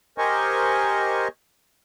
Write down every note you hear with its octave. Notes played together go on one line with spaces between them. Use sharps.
G4 A#4 C5 D#5 G#5 C#6